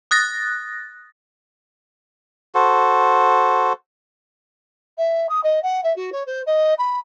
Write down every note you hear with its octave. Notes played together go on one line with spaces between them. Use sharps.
D#6 F#6 A6 A#6
F#4 A4 C5
E5
D#6
D#5
F#5
E5
F#4
C#5
C5
D#5
B5